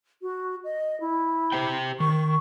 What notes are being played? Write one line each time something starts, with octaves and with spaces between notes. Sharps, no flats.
F#4
D#5
E4
G4 C5 G5
D#3 C#6